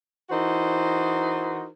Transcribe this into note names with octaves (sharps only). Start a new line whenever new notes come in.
E3 D#4 F#4 A#4 C5